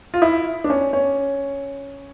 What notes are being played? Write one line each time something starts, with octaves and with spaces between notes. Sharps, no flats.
F4
E4
D4
C#4
C#4